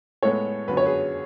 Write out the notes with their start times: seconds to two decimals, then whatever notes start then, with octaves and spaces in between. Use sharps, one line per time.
0.23 A2 G#3 B3 A4 C#5
0.68 F#2 D3 F#3 B3 B4
0.77 C#5
0.85 G#4 B4